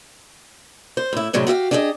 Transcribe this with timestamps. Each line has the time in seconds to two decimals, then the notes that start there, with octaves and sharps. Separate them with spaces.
0.97 C5
1.13 A2 E4
1.33 A2 C3 F#3 G#3 D4
1.47 F#4 G4 E5 F5
1.71 D4 G4 G#4 C#5 D#5